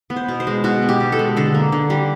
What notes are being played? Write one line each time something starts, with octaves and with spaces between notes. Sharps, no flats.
B3
C5
B2
C5
G#3
B2 F#4
B3
G4
B2
A4
G#3
D3 A4
A#3
D3
G3